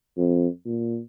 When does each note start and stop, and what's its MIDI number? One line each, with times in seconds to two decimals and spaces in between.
0.17 0.47 41
0.65 1.00 46